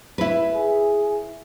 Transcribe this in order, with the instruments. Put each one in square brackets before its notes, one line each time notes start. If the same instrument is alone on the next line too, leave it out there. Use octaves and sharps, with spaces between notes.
[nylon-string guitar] E4 B4
[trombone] G#4